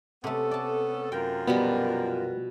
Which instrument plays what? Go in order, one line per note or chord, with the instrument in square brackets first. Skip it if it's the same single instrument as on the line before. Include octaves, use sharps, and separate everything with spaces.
[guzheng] C3 A3 [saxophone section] B3 C#4 A4
[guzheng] D5 A5
[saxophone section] F#2 F4 A#4 [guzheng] G5
[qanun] B2 F3 G3 [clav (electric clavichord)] B3